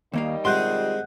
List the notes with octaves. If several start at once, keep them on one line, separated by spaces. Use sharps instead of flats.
D#2 D#3 G3 A#3 D#5 F5
C3 G#3 F4 F#5 C6 F#6 G6